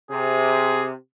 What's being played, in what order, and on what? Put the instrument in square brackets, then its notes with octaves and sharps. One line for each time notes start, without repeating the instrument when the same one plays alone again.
[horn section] C3 [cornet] G#4